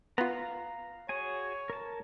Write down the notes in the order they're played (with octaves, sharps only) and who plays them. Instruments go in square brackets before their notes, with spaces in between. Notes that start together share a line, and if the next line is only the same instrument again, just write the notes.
[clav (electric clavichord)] B3 F4 [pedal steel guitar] F5 A#5
[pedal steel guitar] F#4 G#4 G#5 [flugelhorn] C#5
[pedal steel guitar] A#4 A5